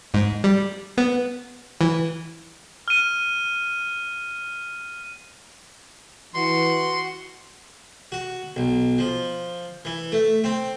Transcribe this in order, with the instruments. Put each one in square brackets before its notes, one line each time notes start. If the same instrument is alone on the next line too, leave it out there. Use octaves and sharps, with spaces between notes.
[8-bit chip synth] G#2
G3
B3
E3
[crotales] F6 D#7
[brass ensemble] E3 [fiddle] F#4 [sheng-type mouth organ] C6
[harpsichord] F#4
B1
F3
E3
A3
C4